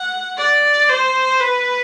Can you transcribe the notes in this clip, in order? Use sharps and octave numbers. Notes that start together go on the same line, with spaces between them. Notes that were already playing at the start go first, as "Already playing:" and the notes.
Already playing: F#5
D5
C5
B4